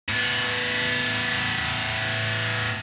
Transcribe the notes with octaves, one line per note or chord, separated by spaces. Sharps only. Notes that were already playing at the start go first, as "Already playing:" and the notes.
A2 B3